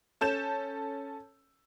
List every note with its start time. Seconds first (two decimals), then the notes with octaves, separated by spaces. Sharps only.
0.21 C#4 A4 G6 E7